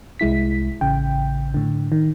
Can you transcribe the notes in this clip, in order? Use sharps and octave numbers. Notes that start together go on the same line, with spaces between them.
C2 G#3 E4 B6
A1 C#3 G5
A2 D3
D#3